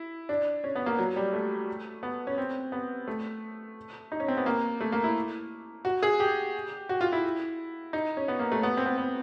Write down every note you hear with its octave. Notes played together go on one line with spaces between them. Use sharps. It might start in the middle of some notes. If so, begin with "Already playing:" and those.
Already playing: E4
D4
C#4
B3
A#3
F#3
G3
A3
B3
C#4
C4
B3
A3
D#4
C#4
C4
B3
A#3
A3
A#3
E4
F#4
G#4
G4
F#4
F4
E4
D#4
C#4
B3
A#3
A3
B3
C4
B3
B3